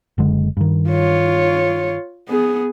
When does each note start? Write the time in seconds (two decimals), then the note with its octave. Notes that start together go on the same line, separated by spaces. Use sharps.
0.18 F#1 D3 G#3
0.57 G2 D#3
0.90 F4 C#5
2.29 B3 G#4